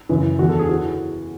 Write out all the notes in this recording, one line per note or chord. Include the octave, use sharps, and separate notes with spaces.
F#2 C#3 E3
E2 D3 F#4
A4
G#4
E3 F#4